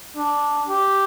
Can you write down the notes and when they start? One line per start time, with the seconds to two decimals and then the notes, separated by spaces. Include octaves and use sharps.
0.16 D4
0.68 G4